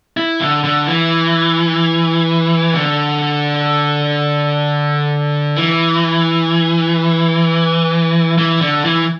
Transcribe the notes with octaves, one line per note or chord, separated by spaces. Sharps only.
E4
D3
D3
E3
D3
E3
E3
D3
E3